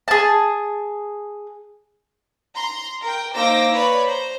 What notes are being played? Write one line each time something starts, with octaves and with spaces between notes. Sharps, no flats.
G#4 A5
A#5 C6
A#4 G5
A#3 D#4 C5 D6 E6 A#6
B4 C#5 D5 B5
C5 A#5